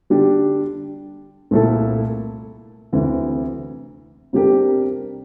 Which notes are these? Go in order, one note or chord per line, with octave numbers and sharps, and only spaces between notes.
D3 G3 D4 G4
C2 A#2 A3 E4 A4
D2 C3 E3
C3 G3 D4 G4 A#4